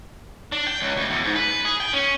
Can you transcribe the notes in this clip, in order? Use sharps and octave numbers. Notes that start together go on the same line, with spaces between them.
D4
G5
C#2
D2
E2
G#2
B4
G#4
G5
C#4